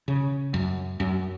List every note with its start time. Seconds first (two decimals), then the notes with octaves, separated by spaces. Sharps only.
0.08 C#3
0.54 F#2
1.00 F#2